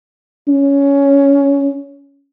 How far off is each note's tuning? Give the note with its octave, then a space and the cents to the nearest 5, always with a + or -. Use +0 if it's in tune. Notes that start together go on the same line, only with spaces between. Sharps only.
C#4 +15